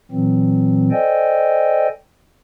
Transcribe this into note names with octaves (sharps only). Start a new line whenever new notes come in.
A#2 E3 F#3 C4
A4 C5 D5 D#5 G5 G#5